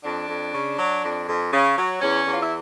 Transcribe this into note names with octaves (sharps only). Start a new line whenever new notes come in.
F2 D4
F2
C#3
F#3
F2
F2
C#3
F#3
E2 C#4
E2
F4
E4